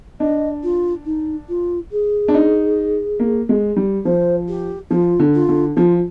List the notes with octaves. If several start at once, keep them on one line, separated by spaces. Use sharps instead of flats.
D4 D#5
F4
D#4
F4
G#4
D4
D#4
A#3
G#3
G3
F3 C5
G4
F3 F4
D3
F4
D3
F3 F4